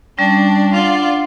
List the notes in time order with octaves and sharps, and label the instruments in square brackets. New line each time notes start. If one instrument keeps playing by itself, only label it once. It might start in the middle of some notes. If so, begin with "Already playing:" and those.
[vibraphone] G3 C#4 [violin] D4
[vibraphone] D4 F#5 [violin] F4 D5